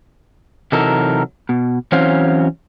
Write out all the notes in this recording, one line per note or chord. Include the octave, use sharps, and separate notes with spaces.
C3 E3 F#3 D#4 A4 A#4
B2
E3 F#3 C4 C#4 C5 F5